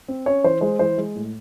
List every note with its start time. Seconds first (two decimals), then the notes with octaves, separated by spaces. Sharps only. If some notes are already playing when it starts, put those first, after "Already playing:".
0.08 C4
0.26 C#4 C#5
0.44 E3 C5
0.61 G#3 C5
0.79 E3 C5
0.98 G#3
1.16 A2